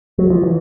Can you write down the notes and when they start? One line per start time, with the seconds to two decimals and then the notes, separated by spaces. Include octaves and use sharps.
0.18 F#3
0.30 F3
0.43 E3